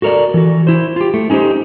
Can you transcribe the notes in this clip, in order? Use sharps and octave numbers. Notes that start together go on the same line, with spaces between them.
F#4 A4 A#4 C#5 D5
E3 F#4
E4 C5
F4 G4
A3
C#4 D#4 F#4 G4 C5